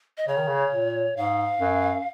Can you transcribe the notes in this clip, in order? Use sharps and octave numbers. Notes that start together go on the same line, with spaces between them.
D#5
C#3 C#5
D#3
C#3
A#2
G#2 F5
F#2